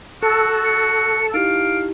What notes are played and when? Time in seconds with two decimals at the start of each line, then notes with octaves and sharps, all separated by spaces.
0.22 F#4 A4 C#7
0.65 C#7
1.34 D#4 E4 G4 F5 D7